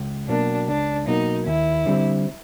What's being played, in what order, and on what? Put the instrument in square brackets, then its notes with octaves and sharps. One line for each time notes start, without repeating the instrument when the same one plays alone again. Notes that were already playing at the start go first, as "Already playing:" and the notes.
Already playing: [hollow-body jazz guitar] C#2
[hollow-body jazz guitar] B2 F#3 A#3 [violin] D4
[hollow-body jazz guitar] C#2 [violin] D4
[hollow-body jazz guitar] B2 F#3 A#3 [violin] D#4
[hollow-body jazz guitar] D#2 [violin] E4
[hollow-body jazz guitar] D3 G3 C4